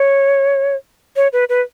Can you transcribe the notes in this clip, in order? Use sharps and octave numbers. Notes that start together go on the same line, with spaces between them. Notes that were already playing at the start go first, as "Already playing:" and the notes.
Already playing: C#5
C#5
B4
B4